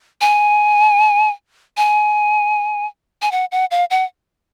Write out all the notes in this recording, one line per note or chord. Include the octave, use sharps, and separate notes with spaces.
G#5
G#5
G#5
F#5
F#5
F5
F#5